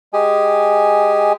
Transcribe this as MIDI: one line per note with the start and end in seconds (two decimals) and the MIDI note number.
0.13 1.33 56
0.13 1.33 67
0.13 1.33 68
0.13 1.33 80